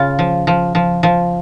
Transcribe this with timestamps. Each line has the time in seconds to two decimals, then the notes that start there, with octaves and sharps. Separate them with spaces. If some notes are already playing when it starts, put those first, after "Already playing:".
Already playing: C#3 F4
0.19 F3
0.47 F3
0.75 F3
1.03 F3